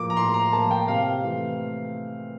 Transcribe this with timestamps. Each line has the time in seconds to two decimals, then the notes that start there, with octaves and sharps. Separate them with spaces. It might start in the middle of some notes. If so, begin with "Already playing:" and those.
Already playing: A2 F3 A#3 D6
0.10 A#5
0.17 A2 C6
0.34 A#5
0.53 F3 A#3 A5
0.71 G5
0.88 C3 F5
1.24 E3 A3